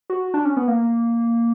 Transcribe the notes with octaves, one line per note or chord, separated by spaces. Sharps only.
F#4
D4
C#4
B3
A#3